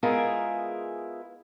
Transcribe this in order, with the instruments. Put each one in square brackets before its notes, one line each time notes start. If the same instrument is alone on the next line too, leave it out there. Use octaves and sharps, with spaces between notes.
[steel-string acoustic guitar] G#3 B3 E4 F4 G#4 A#4